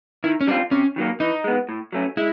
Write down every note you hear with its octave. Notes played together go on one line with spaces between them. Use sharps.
D#3 E4
C#4
G3 C4 D4 F4
C3 C#4
D#3 F#3 A#3
E3 D#4
G#3 B3
A2
F#3 A3 C#4
G#3 E4